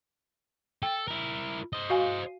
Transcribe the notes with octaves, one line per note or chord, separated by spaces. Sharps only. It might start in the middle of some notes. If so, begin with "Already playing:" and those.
A4 G5
E4 A#4
C5 D#5
F#4 F5 G#5